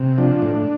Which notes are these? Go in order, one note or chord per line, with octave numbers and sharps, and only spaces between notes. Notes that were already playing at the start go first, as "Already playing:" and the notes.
Already playing: C3
F3 D4
A2